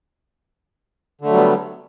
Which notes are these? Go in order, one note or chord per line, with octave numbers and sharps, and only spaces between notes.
D3 F#3 G3 A3 B3